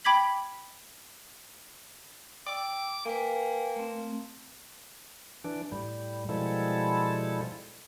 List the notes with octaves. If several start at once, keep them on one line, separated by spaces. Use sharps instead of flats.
G5 B5 D6 G#6 B6 F#7
G5 D6 E6
A#3 B4 G5 G#5
A3 C4
E3 D4
A2 G3
B2 F3 G3 G#3 E4 A4